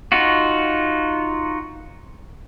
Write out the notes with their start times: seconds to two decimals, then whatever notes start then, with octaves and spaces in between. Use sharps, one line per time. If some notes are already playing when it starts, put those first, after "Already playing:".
0.12 D#4 F4 F#4